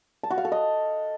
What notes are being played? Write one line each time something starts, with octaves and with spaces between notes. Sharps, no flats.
A5
F#4
F5
A4
D#5